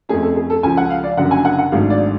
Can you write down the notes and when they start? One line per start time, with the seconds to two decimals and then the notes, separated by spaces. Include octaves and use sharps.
0.09 F2 F3 A3 C#4 G#4
0.22 A4
0.36 G#4
0.50 A4
0.63 C#2 C#3 F3 G#5
0.77 F#5
0.90 F5
1.04 D5
1.17 F#1 F#2 D3 F#5
1.31 G#5
1.45 F#5
1.59 F#5
1.72 G#1 G#2 F#3 A3 D4 F5
1.90 D5